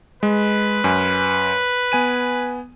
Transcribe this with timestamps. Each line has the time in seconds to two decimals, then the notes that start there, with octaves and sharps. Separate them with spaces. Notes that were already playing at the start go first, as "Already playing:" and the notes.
0.23 G#3 B4
0.84 F#2 G#5
1.92 B3 G#5 D#7